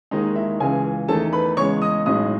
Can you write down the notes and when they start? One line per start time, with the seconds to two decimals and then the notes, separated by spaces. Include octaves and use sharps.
0.11 D#2 D#3 G#3 D#4 D#5
0.36 E4 E5
0.60 C#2 C#3 E3 G#4 G#5
1.08 E2 D#3 A3 A4 A5
1.33 B4 B5
1.57 E2 C#3 G#3 C#5 C#6
1.82 D#5 D#6
2.06 B1 A2 G#3 D#5 D#6